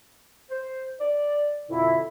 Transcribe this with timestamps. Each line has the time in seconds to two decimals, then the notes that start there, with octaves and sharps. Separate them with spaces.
0.50 C5
1.00 D5
1.69 F2 B2 D3 E4